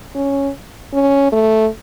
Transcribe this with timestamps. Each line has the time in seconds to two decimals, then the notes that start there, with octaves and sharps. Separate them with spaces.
0.15 C#4
0.93 C#4
1.32 A3